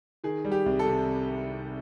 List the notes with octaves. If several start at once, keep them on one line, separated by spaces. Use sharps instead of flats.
D#3 G#4
G3
G4
C2
A4
C3